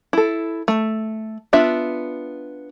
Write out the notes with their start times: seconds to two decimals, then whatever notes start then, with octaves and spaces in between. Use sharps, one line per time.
0.13 E4 A4
0.68 A3
1.53 B3 D4 F4 E5